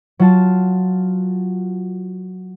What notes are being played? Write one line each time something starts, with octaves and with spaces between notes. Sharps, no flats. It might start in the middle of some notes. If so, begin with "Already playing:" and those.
F#3 F4 A5